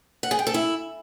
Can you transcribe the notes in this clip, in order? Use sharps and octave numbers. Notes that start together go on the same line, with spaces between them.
F#5
G#4
G5
A4
E4